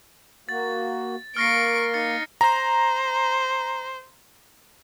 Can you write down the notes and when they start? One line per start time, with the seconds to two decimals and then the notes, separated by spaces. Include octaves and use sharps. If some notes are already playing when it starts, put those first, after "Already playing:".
0.49 A#3 F#4 A6
1.37 A#3 C#6 F6 A#6 C7 D7
1.94 D#4 A6 C#7
2.41 C5 A#5